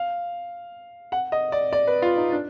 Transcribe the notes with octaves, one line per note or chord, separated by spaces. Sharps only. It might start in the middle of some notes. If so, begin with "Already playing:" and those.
Already playing: F5
F#5
D#5
D5
D5
B4
F4
D#4
D4